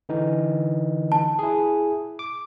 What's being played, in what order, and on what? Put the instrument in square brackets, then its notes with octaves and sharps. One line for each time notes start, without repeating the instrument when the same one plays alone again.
[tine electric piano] D3 E3 D#4
[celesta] A5
[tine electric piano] E4 G#4
D6